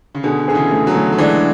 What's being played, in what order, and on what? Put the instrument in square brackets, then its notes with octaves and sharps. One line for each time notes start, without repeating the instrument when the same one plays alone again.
[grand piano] C#3
[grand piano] B2 D3 [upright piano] G#4
[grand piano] D3 [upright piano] G#4
[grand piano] C#3 E3
[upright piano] A3
[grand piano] D3 F#3
[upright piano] A3
[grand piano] F#3
[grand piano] E3 G#3 [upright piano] D4